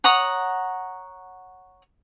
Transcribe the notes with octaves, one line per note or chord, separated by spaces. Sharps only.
C#5 F#5 A#5 D#6